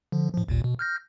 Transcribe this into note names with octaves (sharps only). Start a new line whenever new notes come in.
D3 F3
A2 F3
A1 D#2 A#2
B2
F6 G6 A#6